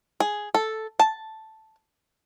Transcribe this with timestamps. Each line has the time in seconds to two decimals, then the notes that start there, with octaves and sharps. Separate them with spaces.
0.20 G#4
0.54 A4
0.99 A5